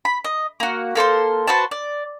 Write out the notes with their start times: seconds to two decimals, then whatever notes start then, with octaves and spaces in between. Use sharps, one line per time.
0.05 B5
0.24 D#5
0.60 A#3 F#4
0.95 A#3 A4 C5 C6
1.47 F#4 B4 C5 A5
1.71 D5